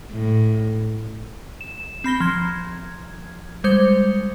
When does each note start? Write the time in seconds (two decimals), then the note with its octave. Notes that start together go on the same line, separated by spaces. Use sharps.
0.12 A2
1.61 E7
2.04 C4 B5 A#6 G7
2.20 F3 G#6
3.64 G3 G#3 C5 G6 C#7